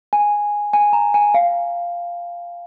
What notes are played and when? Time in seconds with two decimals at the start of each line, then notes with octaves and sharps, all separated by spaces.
0.13 G#5
0.73 G#5
0.93 A#5
1.14 G#5
1.34 F5